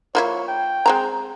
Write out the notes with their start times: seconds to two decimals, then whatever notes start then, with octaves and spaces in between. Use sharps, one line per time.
0.15 F3 A#3 E4 C#5
0.48 G5
0.86 G#3 C4 A#5